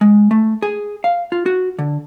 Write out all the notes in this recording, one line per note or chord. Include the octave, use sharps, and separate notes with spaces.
G#3
A3
G#4
F5
F4
F#4
D3